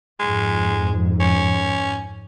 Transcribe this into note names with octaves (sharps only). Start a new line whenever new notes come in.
F2 G#2 G#3
C#4